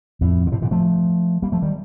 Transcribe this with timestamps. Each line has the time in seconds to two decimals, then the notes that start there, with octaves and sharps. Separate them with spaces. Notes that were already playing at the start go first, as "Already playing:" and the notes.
0.21 F2 A2
0.47 D3
0.52 A2 C3
0.62 A#2 D3
0.71 F3 A3
1.42 G3 A#3
1.52 F3 A3
1.62 D#3 G3